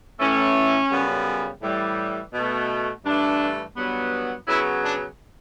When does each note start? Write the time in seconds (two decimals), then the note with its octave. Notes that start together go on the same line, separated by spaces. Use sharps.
0.19 A2 E3 A3 C#4
0.90 F#2 C#3 G3 B3
1.62 A2 E3 G3
2.33 B2 A3
3.04 G2 E3 A3 D4
3.76 G2 F#3 B3
4.46 C#3 F#3 B3 E4
4.82 D4